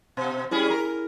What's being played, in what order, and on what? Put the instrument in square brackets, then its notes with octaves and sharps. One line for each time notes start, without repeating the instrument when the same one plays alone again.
[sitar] B2 [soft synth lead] C5
[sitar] G3 C#4 G#4 [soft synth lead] E4
[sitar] A#4